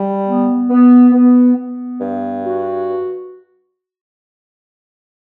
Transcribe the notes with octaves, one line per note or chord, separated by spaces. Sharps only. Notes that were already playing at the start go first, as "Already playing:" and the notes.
Already playing: G3
B3
B3
B3
B3
G2
F#4